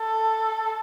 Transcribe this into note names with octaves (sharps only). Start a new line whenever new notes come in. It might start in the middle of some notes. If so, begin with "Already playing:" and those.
Already playing: A4